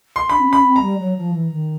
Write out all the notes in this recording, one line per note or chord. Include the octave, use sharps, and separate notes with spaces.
C6
D4 B5
C4
C#4
B5
C4
A#5
G3
F#3
F3
E3
D#3